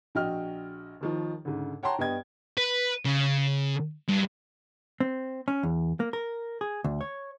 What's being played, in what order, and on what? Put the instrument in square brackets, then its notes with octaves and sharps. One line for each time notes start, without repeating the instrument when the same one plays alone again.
[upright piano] A#1 F#4 D#5 G5 F6
D#2 D#3 F3
D2 G#2 C#3
C#5 F#5 G5 A5 A#5 C6
G2 B3 D#5 G5 G#6
[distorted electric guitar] B4
C#3
G2
[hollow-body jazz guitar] C4
C#4
E2
A#3
A#4
G#4
D2
C#5